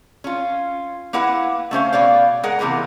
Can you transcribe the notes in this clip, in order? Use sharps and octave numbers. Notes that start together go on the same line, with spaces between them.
C#4 F4
A#3 E4 B4 F#5
A3 C#4 C5 F5
B2 C#5 D5 F5
G#3 G#4 A#4 F#5
C3 E3 A#3 B3 A#4